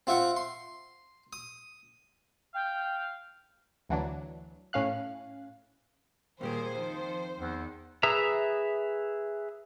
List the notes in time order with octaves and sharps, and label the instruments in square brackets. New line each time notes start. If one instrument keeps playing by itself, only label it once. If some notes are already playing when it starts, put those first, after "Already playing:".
[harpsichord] C4 F4 E5 F#5
C6
D#6
[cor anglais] F5 [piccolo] G5
[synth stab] D2 E3 F#3 D4
A2 C#4 F5 F#6
[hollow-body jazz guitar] D#2 G3 A#4 [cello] A#2 G#4 [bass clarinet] D#3 [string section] C5
[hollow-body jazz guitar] F2 [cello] D#3 [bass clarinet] F3
[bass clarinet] E2 [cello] D#3
[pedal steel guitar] G#4 B4 E5 A#5